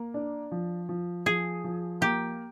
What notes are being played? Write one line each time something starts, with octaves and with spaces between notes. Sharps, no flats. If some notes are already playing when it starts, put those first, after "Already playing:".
Already playing: A#3
D4
F3
F3
F3 G#4
F3
A#3 G4